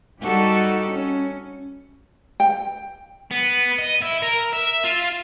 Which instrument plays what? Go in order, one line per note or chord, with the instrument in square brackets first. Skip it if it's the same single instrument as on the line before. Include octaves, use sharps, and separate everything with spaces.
[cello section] G3 D#4 F#4 G4 A4
C#4
[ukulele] G5
[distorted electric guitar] B3
D#5
E4
A#4
E5
F4